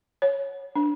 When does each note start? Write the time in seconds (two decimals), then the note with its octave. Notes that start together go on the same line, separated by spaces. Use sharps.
0.22 C#5
0.76 D4